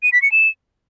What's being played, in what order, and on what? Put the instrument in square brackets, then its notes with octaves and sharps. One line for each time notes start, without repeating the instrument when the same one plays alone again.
[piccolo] D#7
B6
C#7
E7